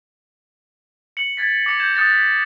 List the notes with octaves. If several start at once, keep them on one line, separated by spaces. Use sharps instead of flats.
C#7 F#7
G#6 A6 B6
D6 A#6 C#7
G6 G#6 E7
D#6 F#6 A6 A#6 C#7
A#6 B6